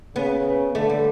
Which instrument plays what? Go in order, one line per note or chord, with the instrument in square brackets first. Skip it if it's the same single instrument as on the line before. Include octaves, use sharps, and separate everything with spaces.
[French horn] C#3 [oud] B3
[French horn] D3 [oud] A3
[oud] G3